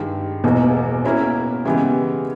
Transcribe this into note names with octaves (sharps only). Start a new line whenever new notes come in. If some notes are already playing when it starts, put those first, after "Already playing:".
Already playing: G2 D#3 G#3
E1 E2 B2 A#3 D#4
B2 A#3 C#4 E4 A#4
C#3 E3 G#3 B3 G4